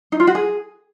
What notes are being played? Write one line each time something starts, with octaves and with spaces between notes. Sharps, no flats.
D#4
F4
F#4
G#4